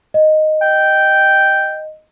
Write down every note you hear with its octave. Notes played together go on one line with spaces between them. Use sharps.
D#5
G5